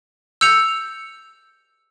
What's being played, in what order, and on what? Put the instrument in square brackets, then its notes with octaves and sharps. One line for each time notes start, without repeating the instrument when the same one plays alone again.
[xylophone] E6 G6 C#7 F7